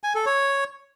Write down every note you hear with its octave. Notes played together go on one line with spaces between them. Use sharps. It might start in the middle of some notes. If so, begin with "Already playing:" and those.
G#5
A4
C#5